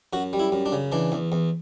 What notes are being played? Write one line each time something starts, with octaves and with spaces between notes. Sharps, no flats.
F#2 F#4
G3
E4
F#2
D4
C#3
E3 D4
E2
E2